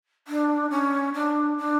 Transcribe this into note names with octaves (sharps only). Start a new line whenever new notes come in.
D4
C#4
D4
D4